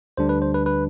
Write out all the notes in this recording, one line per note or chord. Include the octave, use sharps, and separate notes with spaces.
D2 D3 G3 D4 C5
B4
C5
B4
B4